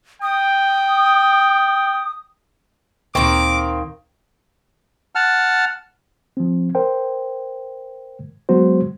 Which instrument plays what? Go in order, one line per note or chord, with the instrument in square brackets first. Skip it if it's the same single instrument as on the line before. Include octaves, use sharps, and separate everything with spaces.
[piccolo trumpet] G5 [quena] D#6
[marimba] D2 A#2 C#6 [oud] D#3 A#3 [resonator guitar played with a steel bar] C4 [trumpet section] D6
[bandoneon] F#5 A5 F6
[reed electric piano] F3 C4
A#4 C5 G5
F#3 G#3 B3 F#4 C5